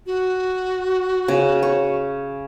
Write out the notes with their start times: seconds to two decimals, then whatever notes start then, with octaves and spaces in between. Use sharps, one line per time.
0.06 F#4
1.28 C#3
1.63 C#5